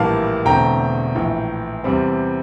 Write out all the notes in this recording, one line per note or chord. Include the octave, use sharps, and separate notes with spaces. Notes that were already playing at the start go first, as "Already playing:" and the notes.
Already playing: A#1 A2 E3 G3 A#3 F5 A5
E1 E2 D3 A3 C4 G5 A#5
A#1 A2 E3
E2 C3 G3 C4